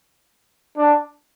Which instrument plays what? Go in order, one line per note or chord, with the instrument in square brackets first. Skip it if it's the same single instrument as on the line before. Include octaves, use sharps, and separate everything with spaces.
[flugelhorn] D4